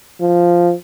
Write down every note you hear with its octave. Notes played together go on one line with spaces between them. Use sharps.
F3